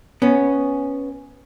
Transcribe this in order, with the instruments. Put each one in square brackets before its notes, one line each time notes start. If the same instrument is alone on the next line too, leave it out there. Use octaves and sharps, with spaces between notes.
[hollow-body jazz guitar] B3 C#4